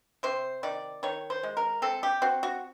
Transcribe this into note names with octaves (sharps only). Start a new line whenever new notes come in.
C3 C5
D#3 D5
D#3 C#5
C5
G#3
A#4
C4 A4
G4
C4 F#4
F#4